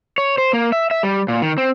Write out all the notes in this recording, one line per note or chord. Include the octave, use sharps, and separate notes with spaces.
C#5
C5
A#3
E5
E5
G3
A#2
D#3
C4